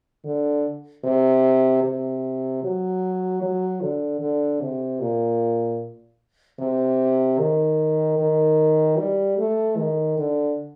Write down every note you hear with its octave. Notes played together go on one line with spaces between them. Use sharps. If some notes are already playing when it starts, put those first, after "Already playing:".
D3
C3
C3
F#3
F#3
D3
D3
C3
A#2
C3
D#3
D#3
G3
A3
D#3
D3